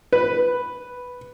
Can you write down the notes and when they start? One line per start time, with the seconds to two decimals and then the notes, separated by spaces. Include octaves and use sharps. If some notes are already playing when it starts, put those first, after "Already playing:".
0.13 B4